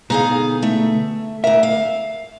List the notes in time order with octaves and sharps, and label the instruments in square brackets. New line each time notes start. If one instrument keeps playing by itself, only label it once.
[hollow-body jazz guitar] B2 D3 B3 [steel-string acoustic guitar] D#4 G#4 F5
[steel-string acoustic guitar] A3 E5
[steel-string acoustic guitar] D2 A#4 [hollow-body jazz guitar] E5
[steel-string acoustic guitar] F5